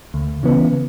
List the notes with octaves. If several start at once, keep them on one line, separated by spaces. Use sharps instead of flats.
D2
C#3 E3 B3